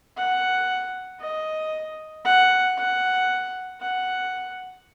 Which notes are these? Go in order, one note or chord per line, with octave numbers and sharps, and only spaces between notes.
F#5
D#5
F#5
F#5
F#5